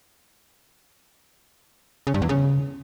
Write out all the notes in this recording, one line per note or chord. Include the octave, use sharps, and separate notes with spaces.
C#3
G2
E2
C#3